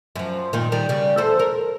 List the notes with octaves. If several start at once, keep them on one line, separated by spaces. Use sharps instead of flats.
F#2 F3
G2 A#2 D#3
D#3 G3 A#4
C#3 G3
E2 A4 C5
A#4